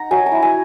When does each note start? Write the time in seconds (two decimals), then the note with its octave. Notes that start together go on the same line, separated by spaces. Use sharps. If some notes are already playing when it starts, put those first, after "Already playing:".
Already playing: D#4 F#5 A#5
0.11 F#3 G#5
0.26 A#5
0.32 E4
0.42 G#5